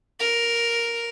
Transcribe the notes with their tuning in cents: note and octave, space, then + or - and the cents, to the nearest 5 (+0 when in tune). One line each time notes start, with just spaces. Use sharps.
A#4 +5